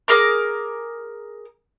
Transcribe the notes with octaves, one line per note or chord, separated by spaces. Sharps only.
G#4 A#4 A#5 D6